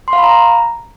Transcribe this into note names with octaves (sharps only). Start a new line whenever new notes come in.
C6
F5
B5
A#5